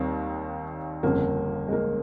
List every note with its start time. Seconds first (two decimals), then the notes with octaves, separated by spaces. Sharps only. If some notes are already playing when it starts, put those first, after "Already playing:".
Already playing: D#2 D#3 G3 C4
1.03 G1 F2 C#3 A#3
1.68 G#3
1.73 A#3